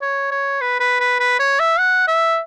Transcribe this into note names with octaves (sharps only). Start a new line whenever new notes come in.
C#5
C#5
B4
B4
B4
B4
C#5
E5
F#5
E5